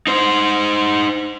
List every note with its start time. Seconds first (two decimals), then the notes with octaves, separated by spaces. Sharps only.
0.07 D#4 C5